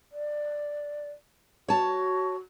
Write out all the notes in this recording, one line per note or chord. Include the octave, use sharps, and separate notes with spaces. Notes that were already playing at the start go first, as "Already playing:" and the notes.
D5
F#4 C#5 A5